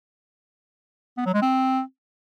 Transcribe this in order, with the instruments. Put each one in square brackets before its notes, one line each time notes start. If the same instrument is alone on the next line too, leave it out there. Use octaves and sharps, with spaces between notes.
[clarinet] B3
F#3
G#3
C4